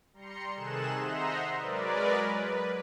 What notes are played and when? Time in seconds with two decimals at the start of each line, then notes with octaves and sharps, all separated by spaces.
0.13 G3 A#5 C6 C#7
0.55 C3 D#3 G#4 A4 F#6 E7
0.98 C5 D#5 E5 F#5 A#5 C6
1.58 F#3 G#3 A#4 B4 D5
2.29 B4